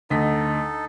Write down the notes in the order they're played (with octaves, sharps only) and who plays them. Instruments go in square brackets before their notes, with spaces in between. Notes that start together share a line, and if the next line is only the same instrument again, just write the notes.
[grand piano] D2 D#5 B6 [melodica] D#4 A4